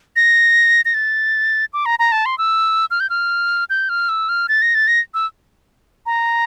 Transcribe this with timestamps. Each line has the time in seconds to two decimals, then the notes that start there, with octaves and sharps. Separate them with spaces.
0.16 A#6
0.85 A#6
0.94 A6
1.73 D6
1.86 A#5
1.99 A#5
2.12 A5
2.26 C6
2.38 E6
2.91 F6
3.00 G6
3.10 F6
3.70 G6
3.89 F6
4.09 E6
4.29 F6
4.49 A6
4.62 A#6
4.75 A6
4.88 A#6
5.14 E6
6.06 A#5